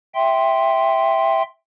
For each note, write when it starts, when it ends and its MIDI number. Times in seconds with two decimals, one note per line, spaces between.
0.15 1.42 76
0.15 1.42 79
0.15 1.42 84